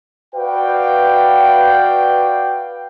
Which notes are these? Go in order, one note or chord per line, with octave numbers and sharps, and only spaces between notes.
F#4 B4 D5 F5 G5